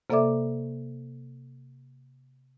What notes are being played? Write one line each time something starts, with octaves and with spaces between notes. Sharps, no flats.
C3 A#3 A4 D5 E5 D6